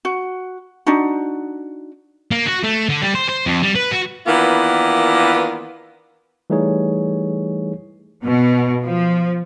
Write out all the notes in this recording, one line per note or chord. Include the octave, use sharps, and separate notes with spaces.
F#4
D4 D#4 F#4
A#3
F#4
A3
D3
G3
C5
C5
F2
G3
B4
F#4
D#3 E3 A#3 B3 D4 F4
E3 G3 A3 D#4 G#4 C#5
B2
F3